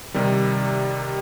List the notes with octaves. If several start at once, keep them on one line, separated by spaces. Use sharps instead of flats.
C3 D#3 G3